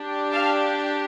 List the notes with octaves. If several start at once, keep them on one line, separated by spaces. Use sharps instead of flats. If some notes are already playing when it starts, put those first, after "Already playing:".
Already playing: D4 G4
F5 A5